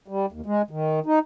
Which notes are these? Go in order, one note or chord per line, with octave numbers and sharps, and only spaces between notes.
G3
D#2
G#3
D#3
D#4